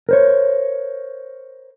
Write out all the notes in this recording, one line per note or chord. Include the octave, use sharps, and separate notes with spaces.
A#4 C5 C#5